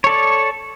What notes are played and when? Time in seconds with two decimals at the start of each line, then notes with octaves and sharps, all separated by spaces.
0.04 C#5
0.07 A4
0.09 D5